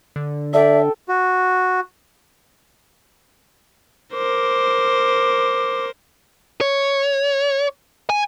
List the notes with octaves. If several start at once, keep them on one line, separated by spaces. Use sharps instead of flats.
D3
A4 D5 E5 G5
F#4
A#4 C5 D6
C#5
G#5